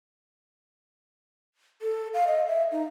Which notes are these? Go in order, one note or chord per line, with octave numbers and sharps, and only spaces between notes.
A4
F5
D#5
E5
D#4